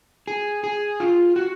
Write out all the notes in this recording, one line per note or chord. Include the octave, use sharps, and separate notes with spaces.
G#4
G#4
F4
F#4